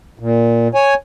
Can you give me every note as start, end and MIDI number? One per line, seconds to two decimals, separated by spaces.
0.19 0.68 46
0.75 0.94 73
0.75 0.94 80